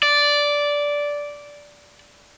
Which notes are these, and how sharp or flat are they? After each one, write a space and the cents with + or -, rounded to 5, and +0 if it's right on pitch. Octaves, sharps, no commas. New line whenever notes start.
D5 -10